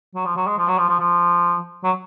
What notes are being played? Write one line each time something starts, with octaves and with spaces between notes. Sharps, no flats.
F#3
F3
F#3
G#3
F3
F#3
F3
F3
F3
F#3